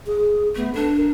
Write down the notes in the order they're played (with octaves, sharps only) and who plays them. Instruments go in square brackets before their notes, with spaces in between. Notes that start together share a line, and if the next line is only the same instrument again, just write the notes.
[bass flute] G#4
[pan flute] A3 [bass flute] B3
[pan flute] D4 [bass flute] A4
[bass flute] A#4